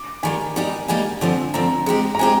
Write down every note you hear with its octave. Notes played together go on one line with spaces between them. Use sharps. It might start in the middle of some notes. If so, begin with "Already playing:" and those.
Already playing: D6
D#3 G3 A#3 G#5
G3 A#3 D#4 G4
G3 A#3 D#4 G4 G#5
D3 F3 C4
D3 F3 C4 A#5
G#3 C4 G4
A#5
G#3 C4 G4 G#5